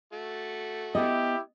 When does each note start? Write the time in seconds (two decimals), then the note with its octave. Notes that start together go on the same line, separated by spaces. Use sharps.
0.13 A3 F#4 A4
0.95 B3 E4 G4 D#5